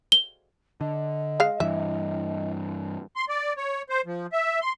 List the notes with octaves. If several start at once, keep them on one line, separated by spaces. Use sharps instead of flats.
G7
D3 D#5
G#3 F5
G2 E3 E5
C6
D5
C#5
C5
F3
E5
C6